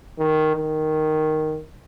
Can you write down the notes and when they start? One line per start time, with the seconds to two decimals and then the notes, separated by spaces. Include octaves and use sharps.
0.19 D#3
0.56 D#3